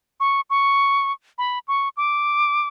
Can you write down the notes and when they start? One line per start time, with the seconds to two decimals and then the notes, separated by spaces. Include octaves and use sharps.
0.20 C#6
0.50 C#6
1.38 B5
1.68 C#6
1.97 D6